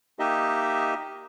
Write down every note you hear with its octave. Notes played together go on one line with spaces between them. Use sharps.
A#3 D#4 G4 D#5 E5